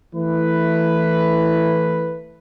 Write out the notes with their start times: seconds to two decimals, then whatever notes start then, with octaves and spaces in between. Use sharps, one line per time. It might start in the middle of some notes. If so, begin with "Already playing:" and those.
0.15 E3 A3 E4 B4